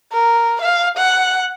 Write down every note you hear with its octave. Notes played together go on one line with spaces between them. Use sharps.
A#4
F5
F#5